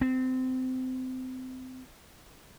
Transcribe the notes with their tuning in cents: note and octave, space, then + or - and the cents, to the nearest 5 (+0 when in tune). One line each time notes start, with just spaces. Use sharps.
C4 -25